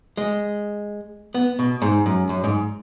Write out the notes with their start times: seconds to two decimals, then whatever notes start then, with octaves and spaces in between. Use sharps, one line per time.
0.17 G#3
1.34 B3
1.59 B2
1.82 G#2
2.06 F#2
2.29 F#2
2.44 G#2